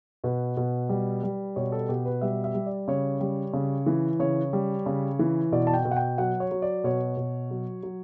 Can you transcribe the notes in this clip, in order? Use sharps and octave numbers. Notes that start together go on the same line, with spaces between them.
B2 B4
B2
G3
G3
B2 C#5
A4
B2 G4
B4
G3 E5
E5
G3
D5
C#3 C#5
G3
C#3
E3
C#3 C#5
G3
C#3
E3
B2 D5
A5
G5
B2
F#5
G5
F#3 F#5
C#5
F#3
D5
B2 C#5
B2
F#3
F#3